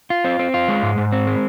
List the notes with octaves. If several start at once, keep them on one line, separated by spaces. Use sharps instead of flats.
F4
C4
C4
F4
G#3
G#2
G#2
C4
G#3